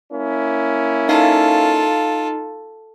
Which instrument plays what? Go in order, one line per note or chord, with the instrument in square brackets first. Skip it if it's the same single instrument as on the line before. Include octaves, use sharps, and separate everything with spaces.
[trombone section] A#3 C#4 E4
[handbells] D#4 F5 [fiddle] F4 A4